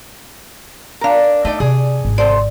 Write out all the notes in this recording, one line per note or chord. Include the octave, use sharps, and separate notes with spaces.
D4 A#4 F5 A#5
A3 D#4 F4 D5
C3 G#4 D5
G#1 D3
C3 A4 C5 D5